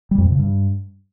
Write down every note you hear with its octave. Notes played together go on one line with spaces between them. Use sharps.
G3
F2
A#2
C#3
G2